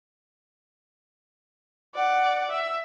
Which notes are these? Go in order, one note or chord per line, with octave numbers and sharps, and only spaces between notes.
D5 F#5
E5